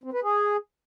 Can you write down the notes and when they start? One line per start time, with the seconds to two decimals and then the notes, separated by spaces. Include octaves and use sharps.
0.04 C4
0.13 B4
0.23 G#4